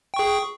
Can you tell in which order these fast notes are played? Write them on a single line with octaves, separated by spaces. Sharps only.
G5 C#6 G#4